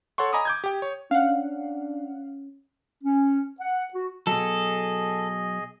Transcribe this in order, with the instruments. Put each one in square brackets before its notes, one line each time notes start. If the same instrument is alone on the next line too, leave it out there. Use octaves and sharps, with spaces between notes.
[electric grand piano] A4 C#5 F#5 C6 C#6
D#5 G#5 A#5 B5 D6 D#6
D6 G6 G#6
G4 G5
C#5
[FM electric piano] C#4 [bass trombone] D4 [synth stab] F5 F#5
[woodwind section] C#4
F#5
F#4
[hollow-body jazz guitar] B2 F#3 [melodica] G#4 D#5 [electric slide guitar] A4